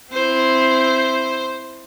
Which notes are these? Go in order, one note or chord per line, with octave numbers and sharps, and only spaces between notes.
C4 E4 C5